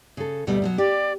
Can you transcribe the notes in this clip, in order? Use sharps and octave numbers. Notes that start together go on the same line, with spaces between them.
C#3 A4
D2 B2 G3
B2 F3 F#3
G4 D5